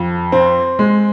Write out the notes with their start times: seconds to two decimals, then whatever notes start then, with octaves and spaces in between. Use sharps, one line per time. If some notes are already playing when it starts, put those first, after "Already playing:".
Already playing: F2
0.32 C4
0.79 G#3